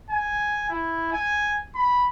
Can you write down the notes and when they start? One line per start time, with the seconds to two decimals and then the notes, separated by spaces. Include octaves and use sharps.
0.10 G#5
0.70 E4
1.12 G#5
1.75 B5